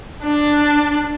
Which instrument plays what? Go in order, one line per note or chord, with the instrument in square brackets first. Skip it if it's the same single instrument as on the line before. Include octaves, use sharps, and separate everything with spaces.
[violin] D4